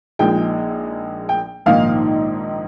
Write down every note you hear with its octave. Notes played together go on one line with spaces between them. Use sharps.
A#1 A#2 G#3 D#4 G5
G5
A#1 G#2 D#3 A#3 D#4 F5